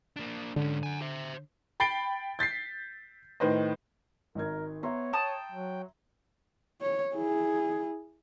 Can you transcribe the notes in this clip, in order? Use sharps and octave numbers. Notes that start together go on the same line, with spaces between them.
A#3 D4
G#2 D3 C#4
F#5 G#5
C5 E5
G5 B5 A6 C7 D7 G7
G6 A6 B6 C7
A2 D#3 B4 C5 D#5
G#1 D#3 A#4 G#6
B3 C#5 E5 A#5 C6
G5 A5 D#6
F#3
C#5
E4 G#4